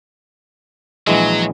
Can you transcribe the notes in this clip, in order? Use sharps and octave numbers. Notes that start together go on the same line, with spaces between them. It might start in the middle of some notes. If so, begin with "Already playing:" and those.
A#1 E3 F#3 G#3